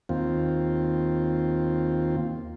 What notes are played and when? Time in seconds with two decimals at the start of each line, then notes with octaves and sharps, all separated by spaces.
0.09 D#2 C4 F4